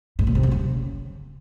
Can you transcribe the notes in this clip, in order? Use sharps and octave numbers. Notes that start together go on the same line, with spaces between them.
G#2
A#2
C3
F#2
C#3